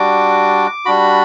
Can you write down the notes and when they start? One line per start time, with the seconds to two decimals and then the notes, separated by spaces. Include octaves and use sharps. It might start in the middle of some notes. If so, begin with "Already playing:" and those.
Already playing: G3 D4 F#4 D6
0.85 G3 D4 F#4 B5